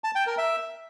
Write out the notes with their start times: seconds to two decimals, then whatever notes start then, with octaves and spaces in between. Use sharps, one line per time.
0.04 A5
0.15 G5
0.27 A#4
0.38 E5